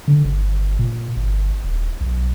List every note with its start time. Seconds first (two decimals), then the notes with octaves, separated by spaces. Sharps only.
0.08 D3
0.25 G1
0.79 A#2
1.16 G1
1.64 D#1
2.01 B1